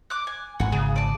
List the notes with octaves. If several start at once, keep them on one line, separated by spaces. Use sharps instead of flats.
D6 F#6
G#5
G#1 F#5 G#5
C#3 G#4
D5 A5